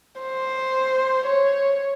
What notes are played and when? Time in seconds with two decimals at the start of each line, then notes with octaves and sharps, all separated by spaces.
0.21 C5
1.26 C#5